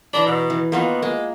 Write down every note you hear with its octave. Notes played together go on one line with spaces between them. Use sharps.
E3 D4 A#5 B5
B2
E3
D#3 A#3 B3 F4
G#3 A#3